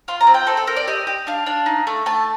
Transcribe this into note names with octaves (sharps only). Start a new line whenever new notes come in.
F4 C6
A#5
C4
G5
C4 A4
A4
A4 A#4
D5
G4 D#5
G4
D4 F5
D4
D#4
A3
A3 A5